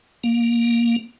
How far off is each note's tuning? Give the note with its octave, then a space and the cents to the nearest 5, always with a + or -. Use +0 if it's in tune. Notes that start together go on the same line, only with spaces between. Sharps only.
A#3 +10